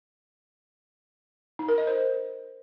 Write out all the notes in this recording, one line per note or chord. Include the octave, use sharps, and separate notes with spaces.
D#4
A#4
D#5
C5